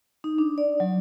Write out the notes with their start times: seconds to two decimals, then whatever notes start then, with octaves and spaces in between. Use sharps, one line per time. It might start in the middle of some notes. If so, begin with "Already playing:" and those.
0.24 D#4
0.38 D4
0.58 D5
0.80 F#3